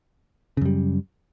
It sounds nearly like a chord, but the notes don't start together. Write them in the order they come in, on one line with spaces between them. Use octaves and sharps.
C#3 F#2 G3